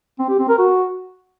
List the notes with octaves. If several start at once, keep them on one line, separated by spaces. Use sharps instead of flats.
C4
G4
C4
A#4
F#4